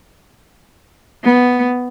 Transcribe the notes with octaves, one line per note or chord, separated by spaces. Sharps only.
B3